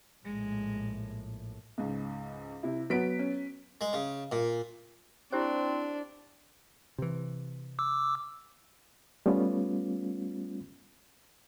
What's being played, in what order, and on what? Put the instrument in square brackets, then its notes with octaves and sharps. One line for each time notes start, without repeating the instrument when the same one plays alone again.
[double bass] A#1 A2 [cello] G#3
[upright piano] C#2 G#2
C3 E4
[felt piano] F#3 B3 [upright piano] B6 D7
[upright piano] C#4
[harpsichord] G#3
C#3
A#2
[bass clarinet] C4 [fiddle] D4 [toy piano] E4 G4 C5
[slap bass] C3 E3
[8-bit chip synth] D6 E6
[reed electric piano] G3 A3 B3 C#4 F4